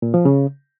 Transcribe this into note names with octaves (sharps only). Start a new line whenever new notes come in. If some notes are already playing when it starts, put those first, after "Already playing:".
A#2
F3
C#3